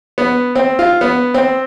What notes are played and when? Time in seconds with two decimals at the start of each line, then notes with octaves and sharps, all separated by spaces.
0.18 B3
0.55 C4
0.79 F4
1.01 B3
1.34 C4